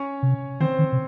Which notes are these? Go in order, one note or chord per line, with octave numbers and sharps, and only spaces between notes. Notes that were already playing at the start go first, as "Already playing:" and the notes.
Already playing: C#4 C#5
C3
D#3 C4 C5
D#3
C3